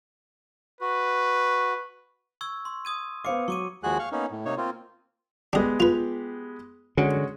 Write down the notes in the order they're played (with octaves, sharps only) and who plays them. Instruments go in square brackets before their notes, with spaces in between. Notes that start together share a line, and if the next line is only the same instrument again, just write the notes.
[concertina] F#4 [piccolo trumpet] B4
[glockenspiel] C#6 E6 G#6
C6
D#6 G#6 D#7
[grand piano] B3 C5 F5 [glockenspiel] D6 C#7
[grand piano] F#3 [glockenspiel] C#6 D6 D#7
[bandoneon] D#2 F3 G#3 F#4 G#4 F#6
F5 C#6
A#3 B3 C#4 D#4
A2
C3 A#3 D#4 C#5
A#3 C4 F4
[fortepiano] G#3 B3 G4 [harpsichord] D4 D#5
[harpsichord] F4 B4
[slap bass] D3 [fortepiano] G#3 C#4 F#4